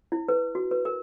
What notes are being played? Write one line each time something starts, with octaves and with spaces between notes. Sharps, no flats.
E4
B4
F#4
B4
A#4